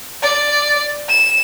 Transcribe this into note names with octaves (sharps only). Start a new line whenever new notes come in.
D5
E7